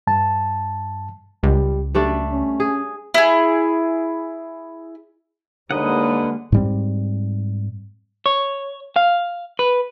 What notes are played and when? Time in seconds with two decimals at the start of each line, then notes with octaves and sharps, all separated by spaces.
0.07 G2 A5
1.43 C#2 G3
1.95 F#2 G3 A3 D4
2.31 C#4
2.60 G#4
3.14 E4 G#4
5.71 D#2 D3 G3 G#3 A#3 B4 D#5 F#5
6.52 G#2 G3 C4
8.26 C#5
8.96 F5
9.59 B4